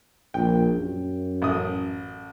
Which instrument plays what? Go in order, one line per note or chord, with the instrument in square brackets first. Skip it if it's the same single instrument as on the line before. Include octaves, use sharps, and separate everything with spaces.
[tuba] A#1 [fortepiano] G5
[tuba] F#2
[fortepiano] A1 D#6